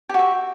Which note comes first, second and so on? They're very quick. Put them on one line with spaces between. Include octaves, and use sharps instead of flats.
G4 F#4 E5